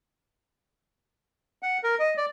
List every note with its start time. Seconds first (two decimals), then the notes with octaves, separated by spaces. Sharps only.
1.62 F#5
1.83 A#4
1.99 D#5
2.17 D5